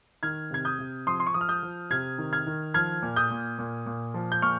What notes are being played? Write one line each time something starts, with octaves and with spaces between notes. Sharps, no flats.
D#3 F6 G#6
C3 G#6
D#6 G6
C3
F3 C6 D#6
C6
C#6
F3 D#6
F6
D#6 G6
F3
C3 F6 G#6
D#3
F6 G#6
D#3
F3 F6 G#6
A#2
D#6 G6
A#2
A#2
A#2
F3
G6
A#2 C#6 F6